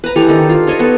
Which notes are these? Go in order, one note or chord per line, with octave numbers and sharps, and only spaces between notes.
B4 A#5
E3 G4 A4 A#5
D3 D#3 D#4
F4
A4 C#5 D#5
B3 A4